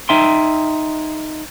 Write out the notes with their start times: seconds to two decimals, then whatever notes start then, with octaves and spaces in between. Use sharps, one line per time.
0.09 D#4 E5 G5 C6